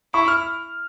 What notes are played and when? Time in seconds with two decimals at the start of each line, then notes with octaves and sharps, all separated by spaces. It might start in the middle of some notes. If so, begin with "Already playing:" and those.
0.14 E4 C#6
0.28 F6